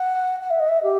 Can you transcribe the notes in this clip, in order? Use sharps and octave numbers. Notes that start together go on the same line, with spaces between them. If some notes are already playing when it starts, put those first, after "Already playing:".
Already playing: F#5
F#5
E5
D#5
E5
G4